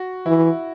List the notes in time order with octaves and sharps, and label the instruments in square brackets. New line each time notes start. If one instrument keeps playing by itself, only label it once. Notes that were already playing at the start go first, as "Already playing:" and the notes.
Already playing: [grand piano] F#4
[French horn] E3 [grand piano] E4